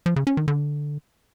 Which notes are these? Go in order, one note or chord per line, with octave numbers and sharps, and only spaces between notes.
F3
C#3
C#4
D#3
D3